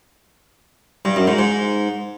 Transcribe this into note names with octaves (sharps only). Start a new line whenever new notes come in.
G2
F#2
G#2
G#2